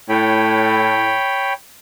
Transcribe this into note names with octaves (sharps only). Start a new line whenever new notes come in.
A2 C#5 G5 B5